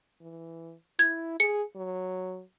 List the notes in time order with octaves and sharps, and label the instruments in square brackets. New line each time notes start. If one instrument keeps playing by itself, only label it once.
[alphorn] E3
[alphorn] E4 [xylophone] G#6
[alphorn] G#4 [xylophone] C#7
[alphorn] F#3